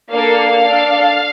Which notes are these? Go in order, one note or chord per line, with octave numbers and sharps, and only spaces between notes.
A#3 D4 A4 F5
D4 A4